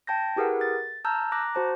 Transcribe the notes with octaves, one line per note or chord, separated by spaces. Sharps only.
G5 A5 G6 A#6
E4 G4 G#4 A#4 B4 F#5
A6
A5 A#5 E6 F6 G6
A#5 D6 F#6 A#6
F#4 C5 A5